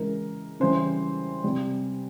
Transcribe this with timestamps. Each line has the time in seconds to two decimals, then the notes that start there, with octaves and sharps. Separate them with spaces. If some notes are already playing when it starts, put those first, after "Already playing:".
Already playing: C#3 E3 G#3 A#4
0.60 C#3 E3 G3 C5
1.44 C3 G3